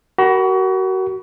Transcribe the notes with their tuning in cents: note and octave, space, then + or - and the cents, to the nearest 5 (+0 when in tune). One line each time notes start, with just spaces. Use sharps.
F#4 +30 A#4 +0 B5 -10